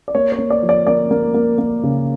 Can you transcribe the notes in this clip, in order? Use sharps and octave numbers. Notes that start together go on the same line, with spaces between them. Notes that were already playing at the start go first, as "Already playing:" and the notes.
D5
A#3 C#5
C#5
A#3
D5
F3
D5
A#3 D5
A#3
A#3
A#3
C#3